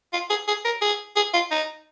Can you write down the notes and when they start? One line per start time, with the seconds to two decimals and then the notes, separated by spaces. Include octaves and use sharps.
0.13 F4
0.30 G#4
0.48 G#4
0.65 A#4
0.81 G#4
1.16 G#4
1.33 F4
1.51 D#4